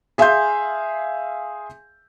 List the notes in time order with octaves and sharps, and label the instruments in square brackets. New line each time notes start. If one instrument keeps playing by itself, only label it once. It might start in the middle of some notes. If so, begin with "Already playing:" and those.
[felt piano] G#4 E5 F5 G#5 C6 G6